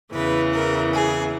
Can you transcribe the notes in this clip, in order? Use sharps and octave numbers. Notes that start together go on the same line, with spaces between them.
E2 C#3 E3 B4
A#4
G#4